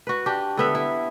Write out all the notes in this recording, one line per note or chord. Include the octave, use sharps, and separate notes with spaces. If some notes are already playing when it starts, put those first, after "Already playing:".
F#4 B4
D4 G4
D3 B3 E5
E4